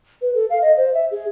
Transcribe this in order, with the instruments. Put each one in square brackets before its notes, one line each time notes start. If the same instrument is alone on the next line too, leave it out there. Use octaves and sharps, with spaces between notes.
[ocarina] B4
A4
F5
D#5
C5
E5
G#4